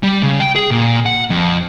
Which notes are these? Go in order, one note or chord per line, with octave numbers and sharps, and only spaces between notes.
G3
C#3
G5
G#4
A#2
F#5
F2